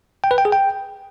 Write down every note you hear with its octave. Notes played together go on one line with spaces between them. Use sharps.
G5
B4
G5
G#4
G5